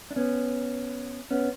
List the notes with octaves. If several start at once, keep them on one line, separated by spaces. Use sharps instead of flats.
D4
B3 C#4
B3 C#4